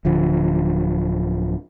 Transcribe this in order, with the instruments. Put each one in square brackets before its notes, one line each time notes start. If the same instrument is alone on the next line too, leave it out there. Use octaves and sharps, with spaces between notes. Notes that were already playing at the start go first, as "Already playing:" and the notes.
[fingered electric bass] D1 D3 F3